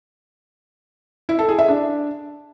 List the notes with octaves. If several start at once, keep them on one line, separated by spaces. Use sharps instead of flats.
E4
A4
G#4
E5
D4